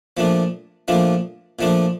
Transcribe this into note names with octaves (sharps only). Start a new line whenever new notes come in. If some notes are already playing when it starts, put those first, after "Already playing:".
A#2 F3 A3 D4
A#2 F3 A3 D4
A#2 F3 A3 D4